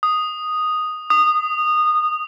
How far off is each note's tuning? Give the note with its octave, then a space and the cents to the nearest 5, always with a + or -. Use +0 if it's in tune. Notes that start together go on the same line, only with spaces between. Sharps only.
D#6 -5
D#6 -20